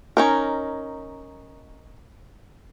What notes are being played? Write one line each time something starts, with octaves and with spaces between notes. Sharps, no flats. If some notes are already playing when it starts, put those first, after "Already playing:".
C#4 D#4 A#4